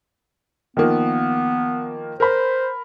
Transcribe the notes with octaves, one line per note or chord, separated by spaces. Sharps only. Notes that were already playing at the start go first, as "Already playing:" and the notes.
D#3 F3 A#3 B3
A#4 C5 B5